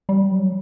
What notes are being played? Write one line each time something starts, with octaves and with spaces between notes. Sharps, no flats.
G3
F#3